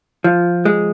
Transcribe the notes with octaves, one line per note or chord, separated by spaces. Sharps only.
F3
G#3